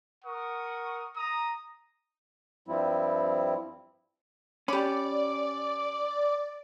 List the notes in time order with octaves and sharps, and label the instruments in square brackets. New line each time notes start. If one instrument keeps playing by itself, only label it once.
[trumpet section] A#4 F#5 C#6 D#6
A#5 D#6
[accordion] G2 F3 G3 C4 E4
[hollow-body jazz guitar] C#4 [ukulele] G4 B5 [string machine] D5 [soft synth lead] D6